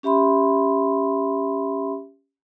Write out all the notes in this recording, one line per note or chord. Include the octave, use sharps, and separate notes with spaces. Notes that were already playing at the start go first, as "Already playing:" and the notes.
C#4 G4 E5 B5 C6